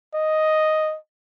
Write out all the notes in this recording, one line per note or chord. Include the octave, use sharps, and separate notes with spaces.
D#5